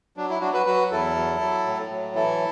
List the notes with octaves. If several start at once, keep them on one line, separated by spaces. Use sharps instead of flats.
F#3 D4
E4
F#3 D4 F#4
F#4 B4
F#3 F#4 B4
E2 E4 A4
F#3
F#3
A2
F#3
E3 E4 A4